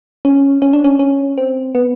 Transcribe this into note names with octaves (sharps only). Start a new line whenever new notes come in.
C#4
C#4
D4
C#4
C#4
C4
B3